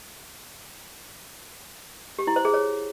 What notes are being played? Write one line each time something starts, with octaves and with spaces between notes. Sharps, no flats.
G4
E4
C5
G#4
C#5